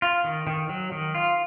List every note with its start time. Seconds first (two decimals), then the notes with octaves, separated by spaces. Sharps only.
0.02 F4
0.24 D#3
0.47 D#3
0.69 F#3
0.92 D#3
1.15 F4